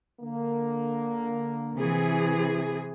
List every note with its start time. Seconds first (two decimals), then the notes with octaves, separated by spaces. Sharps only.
0.20 D3 A#3
1.74 C3 E3 G#4